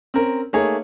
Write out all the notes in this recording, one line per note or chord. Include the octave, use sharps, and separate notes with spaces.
C4 C#4 A#4
A3 A#3 D#4 G#4 C#5